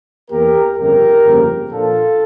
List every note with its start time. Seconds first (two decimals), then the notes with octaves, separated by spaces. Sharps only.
0.30 E2 E3 A#3 G4 A#4
0.77 G1 F2 C#3 G4 A#4
1.24 G1 F2 C#3 F3 A#3
1.70 A#2 F3 A#3 D4 F4 A4